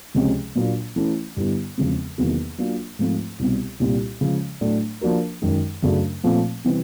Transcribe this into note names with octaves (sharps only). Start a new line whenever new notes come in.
C#2 C3 F3 G#3 C#4
A#2 F#3 A#3 D4 F4
E3 A3 C#4 E4
G2 D3 G3 B3 E4
E2 C#3 F3 G#3 C4
E2 C3 D#3 F#3 A#3
F#3 A#3 D4 F4
G#2 F3 A3 C4 F4
C2 B2 G3 C4
C2 A#2 G3 C4 F4
C#3 F3 G#3
A2 F#3 A3 D4
F3 A#3 D4 F#4 A#4
F#2 D#3 G#3
F#2 C#3 F#3 A3 D4
A#2 F3 A3 C4
C3 E3 G3 C4